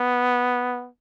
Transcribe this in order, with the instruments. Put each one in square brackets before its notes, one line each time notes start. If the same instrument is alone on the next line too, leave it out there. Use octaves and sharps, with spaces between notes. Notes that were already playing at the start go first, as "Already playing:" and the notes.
Already playing: [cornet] B3